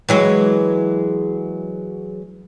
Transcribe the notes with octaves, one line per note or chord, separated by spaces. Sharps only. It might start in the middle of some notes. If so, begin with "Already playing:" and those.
E3 F#3 G#3